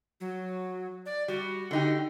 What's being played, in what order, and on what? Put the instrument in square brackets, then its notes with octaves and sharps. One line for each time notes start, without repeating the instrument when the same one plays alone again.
[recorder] F#3
D5
[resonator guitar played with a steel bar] G3 [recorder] F#4
[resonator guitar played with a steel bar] D3 D#4 G4